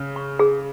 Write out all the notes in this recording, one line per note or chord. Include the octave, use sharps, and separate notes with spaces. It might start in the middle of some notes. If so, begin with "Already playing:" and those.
Already playing: C#3
C#6
G#4